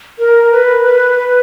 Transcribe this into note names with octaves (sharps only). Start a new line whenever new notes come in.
A#4
B4
B4